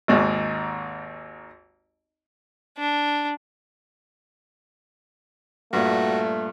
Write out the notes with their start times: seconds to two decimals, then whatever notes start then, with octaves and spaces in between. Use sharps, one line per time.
0.08 G#1 D#2 G#2
2.78 D4
5.73 G2 A#2 A3 F#4